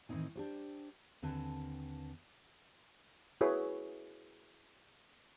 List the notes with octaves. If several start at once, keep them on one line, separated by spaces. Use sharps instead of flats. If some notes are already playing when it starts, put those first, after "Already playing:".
A2 D#3 E3 C4 D#4 G#5
D4 G4 C5
D#2 D3 C4 B4 G#5 A5
E4 F#4 G#4 B4 C#5 E5